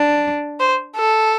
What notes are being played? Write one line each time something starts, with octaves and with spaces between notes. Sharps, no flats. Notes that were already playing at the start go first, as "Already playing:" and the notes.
Already playing: D4
C5
A4